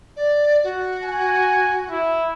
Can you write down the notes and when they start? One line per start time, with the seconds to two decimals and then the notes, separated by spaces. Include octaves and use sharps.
0.16 D5
0.64 F#4
1.03 G#5
1.90 E4